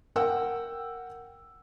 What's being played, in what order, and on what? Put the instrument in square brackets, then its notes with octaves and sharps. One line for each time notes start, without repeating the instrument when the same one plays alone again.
[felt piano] A#4 F#5 G5 E6